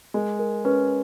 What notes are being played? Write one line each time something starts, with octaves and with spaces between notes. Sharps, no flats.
G#3 A#4
A#4
C#4 B4